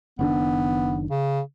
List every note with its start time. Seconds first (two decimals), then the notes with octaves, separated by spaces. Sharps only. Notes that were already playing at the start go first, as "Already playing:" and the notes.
0.19 F#1 D#3 B3 D4
1.10 C#3